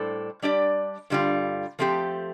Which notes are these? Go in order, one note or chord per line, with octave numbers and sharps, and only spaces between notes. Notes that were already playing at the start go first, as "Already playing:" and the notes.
Already playing: A2 G3 D4 A4 C5
G3 D4 G4 D5
G2 D3 G3 F4
F3 A3 C4 G4